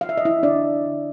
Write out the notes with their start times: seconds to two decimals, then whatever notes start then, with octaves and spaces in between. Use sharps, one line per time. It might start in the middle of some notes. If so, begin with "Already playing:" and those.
0.01 F3 F5
0.09 E5
0.17 D#5
0.25 E4 E5
0.43 D3 D4 D5
0.86 D3